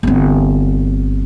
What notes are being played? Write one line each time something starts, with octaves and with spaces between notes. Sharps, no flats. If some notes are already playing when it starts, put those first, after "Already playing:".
G1 C4